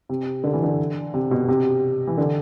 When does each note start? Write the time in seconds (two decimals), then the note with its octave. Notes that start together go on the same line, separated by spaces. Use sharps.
0.09 C3
0.44 D3
0.53 E3
0.63 D3
1.14 C3
1.31 B2
1.48 C3
2.07 E3
2.17 D3